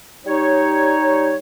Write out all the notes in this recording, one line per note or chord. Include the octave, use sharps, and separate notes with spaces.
G3 D#4 C#5